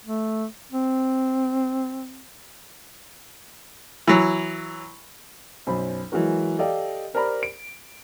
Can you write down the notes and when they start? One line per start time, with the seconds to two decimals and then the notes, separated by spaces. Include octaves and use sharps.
0.05 A3
0.72 C4
4.08 E3 F#3
5.67 B1 F#2 C5 B5
6.12 E3 F#3 G#3 F#4 A#4
6.59 G4 A4 D5 D#5 F5 G5
7.14 G4 A#4 C5 D5 A#5 B5
7.43 D7